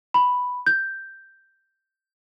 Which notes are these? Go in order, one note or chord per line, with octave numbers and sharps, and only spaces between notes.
B5
G6